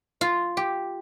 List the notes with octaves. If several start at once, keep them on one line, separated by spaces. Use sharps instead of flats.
F4
G4